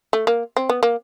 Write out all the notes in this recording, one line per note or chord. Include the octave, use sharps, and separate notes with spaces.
A3
A#3
C4
B3
A#3